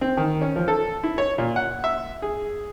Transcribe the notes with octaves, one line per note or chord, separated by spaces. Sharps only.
C4
D#3
C#4
F3
A4
E4
C#5
A#2
F#5
E5
G#4